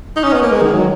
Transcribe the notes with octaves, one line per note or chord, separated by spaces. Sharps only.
D#4
C#4
B3
A#3
G#3
D#3
F#3